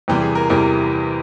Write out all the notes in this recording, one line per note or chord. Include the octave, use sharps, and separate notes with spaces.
E2 C3 E3 G3 G4
G#4
A#4
E2 C3 E3 G3 A#4